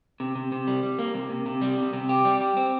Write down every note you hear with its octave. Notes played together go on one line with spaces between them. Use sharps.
C3
C3
C3
G3
G3
A#3
C3
C3
C3
G3
C3
C3
G4
G3
G4
C4